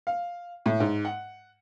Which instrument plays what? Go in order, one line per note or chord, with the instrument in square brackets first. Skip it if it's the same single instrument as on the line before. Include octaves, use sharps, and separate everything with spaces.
[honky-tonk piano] F5
A2
G#2
F#5